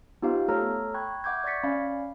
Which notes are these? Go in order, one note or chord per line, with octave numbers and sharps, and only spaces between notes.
B3 D#4 F4 G4 C5 F5
A3 A4 C#5 A#5 F6
G5 B5 C#6 F#6 G#6
E5 F#5 D6 G6 G#6
D5 C#6 G#6 A6 B6 C#7
C#4 D5 F5 B5